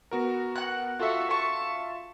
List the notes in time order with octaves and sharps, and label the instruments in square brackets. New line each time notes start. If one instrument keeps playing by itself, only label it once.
[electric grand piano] B3 F#4 A#4
[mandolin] F#5 F#6
[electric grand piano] F4 E5 [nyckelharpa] F#4 A4
[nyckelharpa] A5 [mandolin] C#6